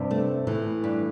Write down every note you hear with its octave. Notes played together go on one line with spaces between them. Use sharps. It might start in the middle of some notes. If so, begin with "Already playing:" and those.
Already playing: G2 C3
A3
A2 E3
G2